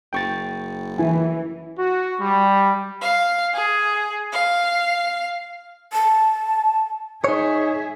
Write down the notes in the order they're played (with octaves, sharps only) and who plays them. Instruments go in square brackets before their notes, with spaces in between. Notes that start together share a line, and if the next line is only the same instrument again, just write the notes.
[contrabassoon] F#1 [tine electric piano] G5 C#6 A6
[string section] E3 [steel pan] E4 G#5
[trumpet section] F#4
G3
[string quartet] F5
G#4
F5
[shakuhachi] A5
[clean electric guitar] D#4 C#5 [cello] G#4 E5